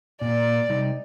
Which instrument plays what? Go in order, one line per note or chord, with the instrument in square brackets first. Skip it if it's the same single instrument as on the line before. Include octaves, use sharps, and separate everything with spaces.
[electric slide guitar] A#2 [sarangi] D5
[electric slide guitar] C3 G3 D#4